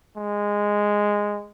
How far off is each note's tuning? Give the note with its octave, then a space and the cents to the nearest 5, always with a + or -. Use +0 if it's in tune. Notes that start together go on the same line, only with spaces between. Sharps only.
G#3 -10